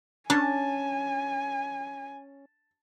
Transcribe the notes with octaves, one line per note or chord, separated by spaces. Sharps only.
C#4 D4 G#5 A5